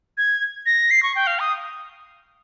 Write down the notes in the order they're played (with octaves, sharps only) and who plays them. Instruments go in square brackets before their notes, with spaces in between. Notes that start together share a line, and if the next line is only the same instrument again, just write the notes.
[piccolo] G#6
A#6
C7
C#6
G5
F5
D#6